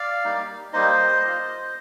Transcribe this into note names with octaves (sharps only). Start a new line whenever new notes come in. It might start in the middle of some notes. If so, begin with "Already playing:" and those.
Already playing: D5 F5
G3 A#3 D#4
G3 A#3 D#4 C5 D#5
A#3 F4